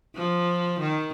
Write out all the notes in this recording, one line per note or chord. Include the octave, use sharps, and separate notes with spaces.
F3
D#3